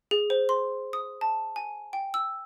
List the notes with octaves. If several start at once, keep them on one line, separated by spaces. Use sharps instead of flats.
G#4
C5
C6
D#6
A5
G#5
G5
E6